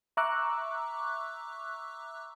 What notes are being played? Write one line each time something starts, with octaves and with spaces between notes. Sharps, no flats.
E5 A#5 C#6 D6 E6 F#6